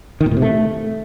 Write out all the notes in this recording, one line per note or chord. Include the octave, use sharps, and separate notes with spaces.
D#3
A#2
A2
C3
A3